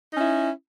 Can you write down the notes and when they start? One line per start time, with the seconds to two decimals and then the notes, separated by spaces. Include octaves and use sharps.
0.12 D#4
0.16 C#4
0.20 E4